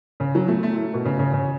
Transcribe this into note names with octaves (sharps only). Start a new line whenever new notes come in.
C#3
F#3
A3
A3
A2
B2
C#3
C#3
C#3